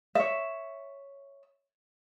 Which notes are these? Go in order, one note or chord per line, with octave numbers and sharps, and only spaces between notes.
C#5 E5